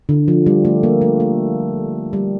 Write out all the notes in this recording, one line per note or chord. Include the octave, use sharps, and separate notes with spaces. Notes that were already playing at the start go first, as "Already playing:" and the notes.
D3
F3
G3
A3
A#3
A3
A3
G3